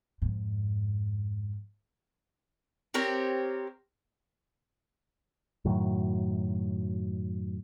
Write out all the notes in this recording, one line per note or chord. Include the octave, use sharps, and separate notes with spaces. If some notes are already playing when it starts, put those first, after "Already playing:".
F2 G#2
C4 G4 A#4 C#5
F#2 A2 D#3 F#3